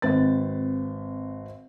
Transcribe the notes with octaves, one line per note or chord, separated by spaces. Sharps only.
G#1 C4 B4 A6